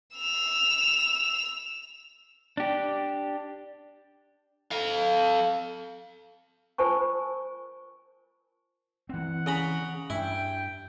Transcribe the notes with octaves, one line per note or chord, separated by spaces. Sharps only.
E6 F7
D4 G4
A4 F5
F4 A#4 C5 G#5 A5 C#6
E3 C4 F#5
C#3 A#5 B5
G2 E4 G5